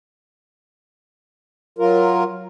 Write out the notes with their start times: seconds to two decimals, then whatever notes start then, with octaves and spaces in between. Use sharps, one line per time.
1.78 F#3 F4 A#4